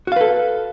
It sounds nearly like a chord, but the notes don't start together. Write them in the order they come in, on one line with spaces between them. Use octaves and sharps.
F#4 F5 B4 A4